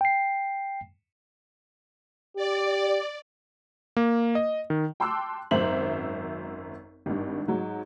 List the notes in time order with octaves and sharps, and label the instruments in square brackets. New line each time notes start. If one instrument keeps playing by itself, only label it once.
[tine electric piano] G5 C7
[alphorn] G4 [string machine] D5
[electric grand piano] A#3
D#5
D#3
[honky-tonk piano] G5 A5 C6 D6 E6 F#6
G#1 F#2 C5 E5 F#7
G#1 G2
G#2 F#3